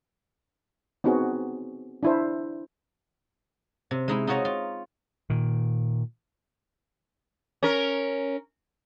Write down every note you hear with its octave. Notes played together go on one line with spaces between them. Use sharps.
B3 C4 D#4 F#4 G#4
D4 E4 C5
C3
G#3 D#4 E4
D#4 F4 F#4 C#5 D#5 A#5
F4
A#2 D#3
C#4 A#4